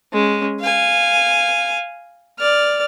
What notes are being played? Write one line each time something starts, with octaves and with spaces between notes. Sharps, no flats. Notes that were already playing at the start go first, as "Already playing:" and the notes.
G#3 C#4
F5 G#5
D5 F6